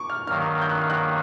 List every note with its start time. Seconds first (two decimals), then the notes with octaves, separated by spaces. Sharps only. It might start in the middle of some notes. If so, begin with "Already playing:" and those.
Already playing: C#6 D6
0.10 F6
0.27 G2 D#3 F#3 A#3 F6
0.62 G6
0.71 F#6
0.80 F6
0.90 F#6